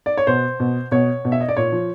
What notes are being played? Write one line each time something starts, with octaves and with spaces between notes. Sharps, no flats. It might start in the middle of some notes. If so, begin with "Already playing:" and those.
D5
C#5
B2 C5
B2
B2 C#5
B2
E5
D#5
D5
A#2 C#5
F3